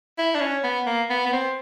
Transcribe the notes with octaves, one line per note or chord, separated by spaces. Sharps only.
E4
D4
C#4
B3
A#3
B3
B3
C4